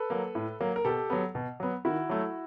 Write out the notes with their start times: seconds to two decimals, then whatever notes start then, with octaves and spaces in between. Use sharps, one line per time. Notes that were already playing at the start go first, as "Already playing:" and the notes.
Already playing: A4 B4
0.10 F#3 A#3
0.35 A2
0.60 F#3 A#3
0.76 A#4
0.85 B2 G4 A4
1.10 F#3 B3
1.35 B2
1.60 F#3 B3
1.85 D#3 E4 F#4
2.09 F#3 A3